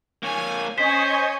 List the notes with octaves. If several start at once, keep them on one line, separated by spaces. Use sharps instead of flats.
A#3 C#5 G#5
C#4 C5 D#5 G#5 C#6 B6